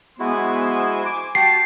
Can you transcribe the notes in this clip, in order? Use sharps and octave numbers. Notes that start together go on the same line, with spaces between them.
G#3 B3 E4 F#4 C5 G#5
D6
F#4 G4 G5 A5 C7